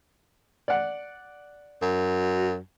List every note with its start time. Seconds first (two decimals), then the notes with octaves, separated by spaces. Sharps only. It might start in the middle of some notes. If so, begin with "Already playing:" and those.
0.68 D5 F#5
1.82 F#2